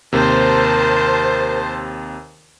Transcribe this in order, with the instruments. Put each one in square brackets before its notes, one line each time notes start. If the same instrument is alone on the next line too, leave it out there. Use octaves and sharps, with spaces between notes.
[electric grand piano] D#2 C3 [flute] A#4 [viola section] C5 A5